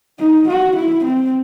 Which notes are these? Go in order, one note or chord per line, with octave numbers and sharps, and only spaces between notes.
D#4
F#4
E4
C4